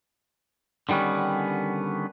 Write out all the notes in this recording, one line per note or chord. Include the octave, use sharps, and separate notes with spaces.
D3 D#3 G3 B3 C#4